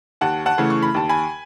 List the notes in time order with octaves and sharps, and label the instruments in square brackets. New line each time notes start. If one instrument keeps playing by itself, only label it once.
[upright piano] D#2 F#5 A5
F#5 A5
C#3 E3 A3
C#6
B5
D#2 A5
G#5 B5